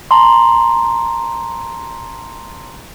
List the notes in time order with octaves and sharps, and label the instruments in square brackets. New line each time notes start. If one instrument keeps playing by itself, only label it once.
[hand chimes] A5 A#5 C6